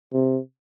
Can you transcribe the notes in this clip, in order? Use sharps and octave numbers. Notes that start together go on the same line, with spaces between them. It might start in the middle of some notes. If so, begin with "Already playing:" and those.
C3